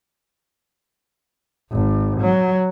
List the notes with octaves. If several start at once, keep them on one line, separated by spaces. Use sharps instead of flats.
G#1
F#3